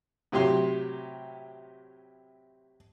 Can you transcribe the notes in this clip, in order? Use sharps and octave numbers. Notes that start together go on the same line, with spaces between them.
A2 C3 F#3 G4 C6